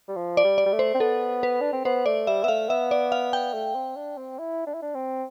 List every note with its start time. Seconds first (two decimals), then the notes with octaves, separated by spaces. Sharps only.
0.08 G3
0.16 F3
0.37 D5
0.44 G3
0.58 D5
0.66 G3
0.73 A3
0.79 C5
0.94 C4
1.00 B3 A4
1.43 B4
1.61 D4
1.73 C4
1.85 B3 C5
2.06 A3 D5
2.27 G3 E5
2.44 B3 E5
2.48 A3 F5
2.69 B3 E5
2.91 D5
3.12 F5
3.33 G5
3.54 A3
3.75 C4
3.96 D4
4.17 C4
4.39 E4
4.67 D4
4.74 E4
4.82 D4
4.95 C4